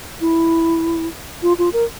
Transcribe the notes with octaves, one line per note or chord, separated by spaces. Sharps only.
E4
F4
F4
A#4